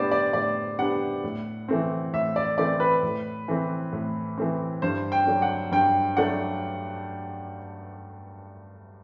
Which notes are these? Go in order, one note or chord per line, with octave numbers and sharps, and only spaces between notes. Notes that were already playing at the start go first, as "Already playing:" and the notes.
Already playing: A2 G3 B3 D4 C5 D5
D5
A2 D5
G3 B3 D4 F#5
A2
E3 A3 C4
A2 E5
D5
E3 A3 C4 D5
B4
A2
E3 A3 C4
A2
E3 A3 C4
G2 C5
G5
F#3 A3 D4
F#5
G2 G5
F#3 A3 D4 F#5